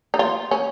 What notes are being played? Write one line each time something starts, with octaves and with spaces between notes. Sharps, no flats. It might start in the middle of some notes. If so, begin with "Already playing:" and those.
D#4
F4
C#4